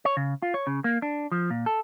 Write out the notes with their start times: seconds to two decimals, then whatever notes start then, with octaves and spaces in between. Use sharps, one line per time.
0.05 C#5
0.17 C#3
0.42 F4
0.54 C#5
0.67 C#3
0.84 A#3
1.02 D4
1.32 F3
1.50 A#2
1.66 A4